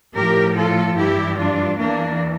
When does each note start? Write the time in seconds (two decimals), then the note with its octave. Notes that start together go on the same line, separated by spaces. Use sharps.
0.15 A2 F3 G4 A#4
0.56 F4 A4
0.97 G2 E3 E4 G4
1.38 D4 F4
1.79 E2 E3 A#3 D4